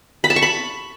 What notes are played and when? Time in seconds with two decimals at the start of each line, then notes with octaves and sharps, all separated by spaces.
0.24 B5
0.30 A5
0.36 C#6
0.42 B5